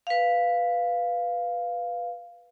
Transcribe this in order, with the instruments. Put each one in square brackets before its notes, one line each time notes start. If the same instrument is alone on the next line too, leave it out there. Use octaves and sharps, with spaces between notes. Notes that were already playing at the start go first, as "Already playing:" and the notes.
[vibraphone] B4 F5